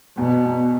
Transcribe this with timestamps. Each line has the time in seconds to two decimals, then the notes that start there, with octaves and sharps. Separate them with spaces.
0.18 E2 B2
0.45 E2